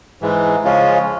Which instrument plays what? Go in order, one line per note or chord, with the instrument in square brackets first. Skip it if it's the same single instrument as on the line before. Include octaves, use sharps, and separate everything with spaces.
[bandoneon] G#2 E3 G#3
C#3 F3 G#3 C#4 F4